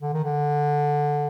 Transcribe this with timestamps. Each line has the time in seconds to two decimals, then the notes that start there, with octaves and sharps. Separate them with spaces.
0.03 D3
0.14 D#3
0.24 D3